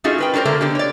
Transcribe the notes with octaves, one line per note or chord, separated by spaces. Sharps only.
A3 C#4 D#4 F4 F#4 G#4
A#4 B4 G5
D4 F#4 G4 A#4 C5
D3 A3 A#3 A#4
D3 B3 G4
C#5 D5